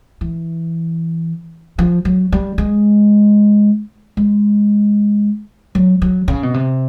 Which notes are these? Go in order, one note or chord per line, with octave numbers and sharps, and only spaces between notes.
E3
F3
F#3
G3
G#3
G#3
F#3
F#3
C#3
B2
C3